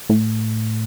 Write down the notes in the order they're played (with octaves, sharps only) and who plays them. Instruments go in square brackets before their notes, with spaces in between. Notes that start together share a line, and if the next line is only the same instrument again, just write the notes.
[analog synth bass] A2